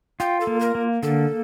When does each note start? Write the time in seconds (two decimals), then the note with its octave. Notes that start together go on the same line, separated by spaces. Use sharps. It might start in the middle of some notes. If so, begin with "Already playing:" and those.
0.20 F4 G5
0.41 A4
0.47 A#3
0.61 A#4
0.75 A#3
1.03 D3 A4